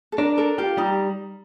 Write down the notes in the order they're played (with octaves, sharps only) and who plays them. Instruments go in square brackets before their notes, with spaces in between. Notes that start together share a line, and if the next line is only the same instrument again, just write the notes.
[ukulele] A4
[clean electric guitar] D4 [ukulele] A#4
[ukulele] A4 [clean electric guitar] A#4
[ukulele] F4 [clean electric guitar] G4
[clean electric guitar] G3 [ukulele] D#4